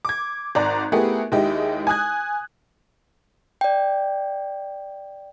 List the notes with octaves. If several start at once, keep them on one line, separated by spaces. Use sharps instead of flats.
D6 G#6
G#1 D5 A#5 F#6
A3 B3 E4 G4 G#4 A#4
D#2 G#3 E4 G4 D#5
G#5 D#6 F#6 G#6
D5 G5